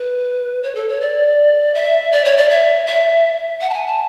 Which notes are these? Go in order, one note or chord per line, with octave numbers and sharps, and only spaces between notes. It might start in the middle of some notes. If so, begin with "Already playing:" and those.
Already playing: B4
C#5
A4
C#5
D5
E5
D5
C#5
D5
E5
E5
F#5
A5
G#5
A5